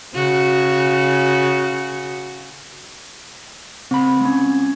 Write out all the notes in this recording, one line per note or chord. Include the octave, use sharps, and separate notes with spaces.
C#3 F#4
C#2 C4 B5
G#3 C#4